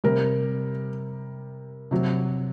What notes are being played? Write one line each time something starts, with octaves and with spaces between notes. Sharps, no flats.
C3 G3 A#4
C3 F#3